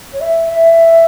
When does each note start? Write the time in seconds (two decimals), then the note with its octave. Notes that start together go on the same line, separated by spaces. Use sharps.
0.12 C#5
0.20 E5
0.48 E5